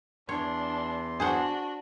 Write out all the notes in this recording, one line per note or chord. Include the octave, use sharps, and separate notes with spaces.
E2 D4 C#5 C6
D4 F#4 G#4 C5 F#5